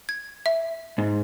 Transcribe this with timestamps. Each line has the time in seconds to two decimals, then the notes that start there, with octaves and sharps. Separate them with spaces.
0.09 G#6
0.46 E5
0.98 G#2